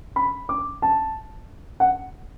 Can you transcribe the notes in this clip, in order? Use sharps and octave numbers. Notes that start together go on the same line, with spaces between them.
B5
D6
A5
F#5